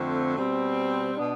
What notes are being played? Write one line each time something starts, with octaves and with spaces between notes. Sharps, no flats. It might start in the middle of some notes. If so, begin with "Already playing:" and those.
Already playing: F2 D3 A3 C4
B2 G3 C4
B2 B3 D4